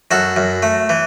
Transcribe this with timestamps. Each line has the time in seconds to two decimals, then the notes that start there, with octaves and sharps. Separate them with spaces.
0.11 F#2 F#4 A4
0.36 F#2
0.63 A3
0.89 E3